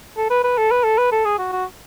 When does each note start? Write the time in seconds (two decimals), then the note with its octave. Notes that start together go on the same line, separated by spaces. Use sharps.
0.17 A4
0.30 B4
0.43 B4
0.57 A4
0.71 B4
0.84 A4
0.98 B4
1.12 A4
1.25 G#4
1.38 F#4
1.52 F#4